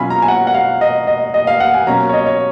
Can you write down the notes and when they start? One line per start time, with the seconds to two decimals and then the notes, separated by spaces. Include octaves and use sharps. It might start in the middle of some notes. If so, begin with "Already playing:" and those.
Already playing: B2 F#3 C#4 F4 G#5 B5
0.10 A#5
0.22 G#5
0.28 F#5
0.47 F#5
0.54 F5
0.81 D#5
1.07 D#5
1.34 D#5
1.47 F5
1.60 F#5
1.74 G#5
1.87 B2 F#3 A#3 C#4 A#5
2.09 C#5
2.13 D#5
2.26 C#5